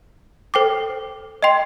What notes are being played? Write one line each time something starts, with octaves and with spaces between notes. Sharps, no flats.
A4 C5 G5 D6
D#5 G5 C6